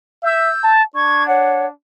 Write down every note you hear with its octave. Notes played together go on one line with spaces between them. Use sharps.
E5 E6 G6
A5
D4 C#6 G#6
C#5 F#5